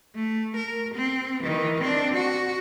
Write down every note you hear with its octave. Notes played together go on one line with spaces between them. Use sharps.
A3
A#4
C4
D#3 E3
C4 D4
F#4